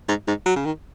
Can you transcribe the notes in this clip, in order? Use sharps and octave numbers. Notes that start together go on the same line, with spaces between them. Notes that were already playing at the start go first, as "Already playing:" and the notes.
G#2
G#2
F#3
C#3
D#3